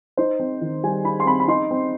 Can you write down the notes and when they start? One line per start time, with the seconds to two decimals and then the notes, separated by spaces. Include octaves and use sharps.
0.17 D#4 C5
0.39 C4
0.61 D#3
0.83 G3 G#5
1.04 D#4 B5
1.20 C6
1.26 C4 B5
1.40 B5
1.48 D#4 C6
1.71 C4